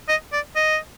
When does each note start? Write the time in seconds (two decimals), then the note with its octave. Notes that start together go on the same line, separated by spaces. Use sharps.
0.09 D#5
0.33 D5
0.56 D#5